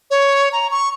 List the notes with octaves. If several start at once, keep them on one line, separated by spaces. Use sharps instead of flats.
C#5
A#5
C#6